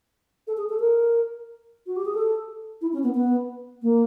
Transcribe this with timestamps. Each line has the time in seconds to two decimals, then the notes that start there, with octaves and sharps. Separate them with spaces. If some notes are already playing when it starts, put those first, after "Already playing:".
0.47 A4
0.57 G#4
0.69 A4
0.80 A#4
1.87 F#4
1.96 G4
2.05 G#4
2.14 A4
2.81 E4
2.93 C#4
3.03 B3
3.14 B3
3.82 A#3